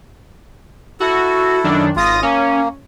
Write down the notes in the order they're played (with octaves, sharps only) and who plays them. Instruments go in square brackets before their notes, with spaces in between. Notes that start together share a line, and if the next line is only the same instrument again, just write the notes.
[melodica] E4 A4 [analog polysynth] F#4
[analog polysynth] F#2 D#3 D4
[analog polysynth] G#1 D#6 A#6 [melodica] F4
[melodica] A#3 [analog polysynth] C#4